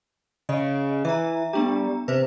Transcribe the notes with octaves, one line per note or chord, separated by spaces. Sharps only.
C#3 D#5
E3 E5 A#5
G3 B3 D4 A#5
C3 B4 C5